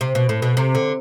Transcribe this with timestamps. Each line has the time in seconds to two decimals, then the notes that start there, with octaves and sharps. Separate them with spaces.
0.01 C3
0.15 B2
0.29 A2
0.42 B2
0.57 C3
0.75 D3